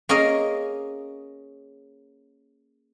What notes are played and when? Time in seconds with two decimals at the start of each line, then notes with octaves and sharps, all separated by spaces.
0.09 A#3 C#4 G#4 A#4 D#5